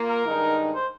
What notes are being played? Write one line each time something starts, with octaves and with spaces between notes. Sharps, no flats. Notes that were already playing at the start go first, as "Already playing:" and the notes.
Already playing: A#3 F4
A#4
G2 D#3 G#3 D#4
C5